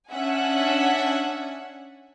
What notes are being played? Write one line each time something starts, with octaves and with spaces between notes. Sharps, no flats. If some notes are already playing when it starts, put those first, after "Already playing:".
C#4 D4 E5 F#5 G#5